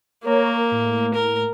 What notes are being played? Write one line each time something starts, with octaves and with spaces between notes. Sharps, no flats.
A#3 A#4 C#5 A#5
A2
A#4